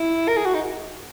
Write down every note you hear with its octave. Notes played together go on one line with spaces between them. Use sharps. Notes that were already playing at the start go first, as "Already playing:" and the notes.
Already playing: E4
A#4
G#4
F#4
D#4